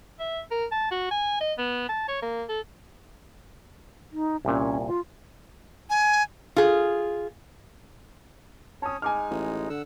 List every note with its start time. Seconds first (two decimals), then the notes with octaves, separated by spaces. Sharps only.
0.20 E5
0.51 A#4
0.72 A5
0.91 F#4
1.11 G#5
1.41 D#5
1.58 B3
1.89 A5
2.08 C#5
2.22 A#3
2.49 A4
4.12 D#4
4.45 C2 A#2 C#4
4.87 F4
5.90 G#5
6.56 F4 G#4
8.82 C#4 C#5 A5 D#6
9.02 G#3 D#4 G#5 D6 F6
9.31 A1
9.70 D3 F#5 E6